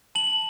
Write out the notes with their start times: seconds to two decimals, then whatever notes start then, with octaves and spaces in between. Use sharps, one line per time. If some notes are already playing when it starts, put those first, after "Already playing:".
0.15 A5 F#7